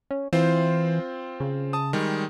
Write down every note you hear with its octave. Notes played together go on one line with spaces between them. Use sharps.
C#4
E3 C4 F4 C5
C#3
A5 D#6
D#3 G3 G#3